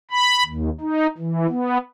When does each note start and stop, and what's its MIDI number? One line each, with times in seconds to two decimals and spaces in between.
0.11 0.43 83
0.46 0.70 39
0.81 1.07 63
1.18 1.47 52
1.49 1.78 59